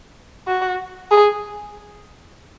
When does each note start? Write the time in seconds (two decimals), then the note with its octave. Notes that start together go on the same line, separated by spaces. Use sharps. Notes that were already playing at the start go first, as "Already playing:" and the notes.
0.47 F#4
1.11 G#4